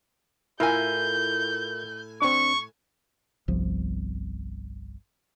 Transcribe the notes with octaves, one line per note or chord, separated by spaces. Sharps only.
A2 E4 F4 A#4 G#5 G6
C4 D4 C#6
G1 C2 F3